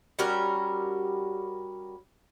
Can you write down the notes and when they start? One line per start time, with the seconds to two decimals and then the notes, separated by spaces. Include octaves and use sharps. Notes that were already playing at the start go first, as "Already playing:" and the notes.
0.19 G3 C#4 F#4 A#4